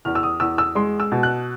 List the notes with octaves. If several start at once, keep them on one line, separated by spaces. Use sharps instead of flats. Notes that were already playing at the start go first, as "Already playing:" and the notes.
E2 F6
E6
D#6
E2 E6
E6
G#3 C6
E6
B2
F#6